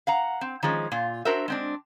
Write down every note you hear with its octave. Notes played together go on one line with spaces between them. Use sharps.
F5 F#5 A#5
C4
D#3 F3 G#3 C#4
A#2 F4
D4 F#4 A#4 C5 E5
G#3 C4 D4